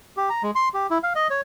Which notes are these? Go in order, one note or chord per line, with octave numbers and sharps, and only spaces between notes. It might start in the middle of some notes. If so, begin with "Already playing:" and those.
G4
A#5
G#3
C6
G4
E4
F5
D#5
C#5